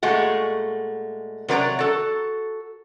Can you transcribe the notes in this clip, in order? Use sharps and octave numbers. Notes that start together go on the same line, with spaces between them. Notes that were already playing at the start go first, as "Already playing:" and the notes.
A#2 G#3 A3 F#4
C3 F#3 A#4 D5 A#5
F#4 A4